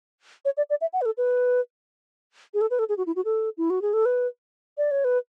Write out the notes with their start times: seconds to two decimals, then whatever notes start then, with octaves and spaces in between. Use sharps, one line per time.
0.45 C#5
0.57 D5
0.70 D5
0.81 E5
0.93 F#5
1.01 B4
1.06 A4
1.17 B4
2.54 G#4
2.61 A4
2.71 B4
2.79 A4
2.89 G#4
2.98 F#4
3.07 E4
3.16 F#4
3.25 A4
3.58 E4
3.70 F#4
3.82 G#4
3.93 A4
4.05 B4
4.78 D5
4.91 C#5
5.05 B4